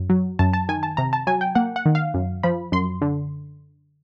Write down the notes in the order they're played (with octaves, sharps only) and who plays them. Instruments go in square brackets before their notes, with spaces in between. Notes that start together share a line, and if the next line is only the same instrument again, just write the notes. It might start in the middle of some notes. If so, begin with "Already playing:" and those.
Already playing: [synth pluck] F#2
F#3
F#2 A5
A5
D#3 G#5
A5
C3 A#5
A5
F#3 G#5
G5
A#3 F#5
F#5
D#3
F5
F#2
F3 B5
F#2 C6
D3